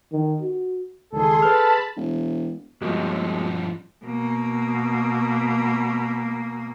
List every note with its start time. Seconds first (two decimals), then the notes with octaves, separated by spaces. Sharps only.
0.12 D#3
0.42 F#4
1.13 C#2 D#3 G#4 A4 C6
1.42 B4 A5 B5 F6
1.97 E1
2.82 G2 F3 F#3 G#3 A#3
4.05 B2 A#3